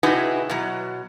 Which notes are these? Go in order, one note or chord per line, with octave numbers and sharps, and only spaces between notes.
C3 D#4 E4 F#4 G#4 B4
B2 F#3